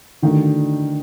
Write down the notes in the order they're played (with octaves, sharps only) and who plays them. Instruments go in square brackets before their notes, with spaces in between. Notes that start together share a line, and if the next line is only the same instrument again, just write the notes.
[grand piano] D3 A3 D4 F#4 [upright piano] D#3